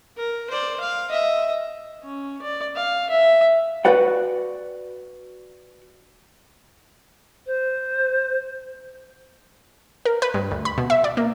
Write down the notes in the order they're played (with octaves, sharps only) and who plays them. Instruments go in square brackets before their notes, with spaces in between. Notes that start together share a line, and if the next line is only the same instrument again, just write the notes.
[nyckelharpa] A#4
C5 D5
F5
D#5 E5
C#4
D5
F5
E5
[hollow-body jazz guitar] F#4 B4 D5 F#5
[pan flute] C5
[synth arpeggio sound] A#4
B4
G2
D2
B5
B2
E5
D5
A#3